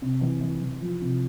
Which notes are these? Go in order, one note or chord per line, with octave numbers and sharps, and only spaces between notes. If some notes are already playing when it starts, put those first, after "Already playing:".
C3
E3
E3
E3
F3
C3